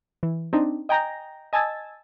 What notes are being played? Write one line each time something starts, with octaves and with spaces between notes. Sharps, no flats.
E3
C4 D4 D#4
D#5 G5 G#5 A#5 G6 A#6
D#5 G#5 A5 E6 G#6 A6